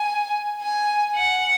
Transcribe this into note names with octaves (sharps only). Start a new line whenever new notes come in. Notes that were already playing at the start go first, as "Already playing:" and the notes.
Already playing: G#5
G#5
F#5